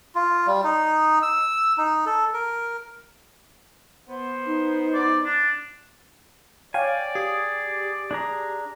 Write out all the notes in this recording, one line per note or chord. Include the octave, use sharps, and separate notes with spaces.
F4
G3
D#4
E6
D#4
A4
A#4
B3 C5
D#4
D5
D4
C#5 D5 F5 G5 G#5
G4 G#4
D4 G#4 A#5